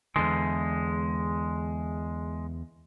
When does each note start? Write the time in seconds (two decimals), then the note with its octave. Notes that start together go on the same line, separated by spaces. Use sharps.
0.16 E2 D3 G#3